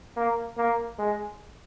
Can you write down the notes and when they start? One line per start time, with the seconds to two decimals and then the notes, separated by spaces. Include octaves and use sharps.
0.16 A#3
0.57 A#3
0.99 G#3